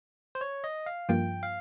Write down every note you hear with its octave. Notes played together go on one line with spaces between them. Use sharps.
C5
C#5
D#5
F5
G2 F3 A#3 F4 G5
F5